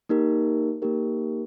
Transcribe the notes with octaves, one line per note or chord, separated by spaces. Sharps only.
A#3 D#4 G4 A#4
A#3 D#4 G4 A#4